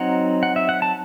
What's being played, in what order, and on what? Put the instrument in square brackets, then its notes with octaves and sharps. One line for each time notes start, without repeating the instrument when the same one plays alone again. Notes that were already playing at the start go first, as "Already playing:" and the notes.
Already playing: [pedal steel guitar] F#3 C4 D#4 F#5
F#5
E5
F#5
A5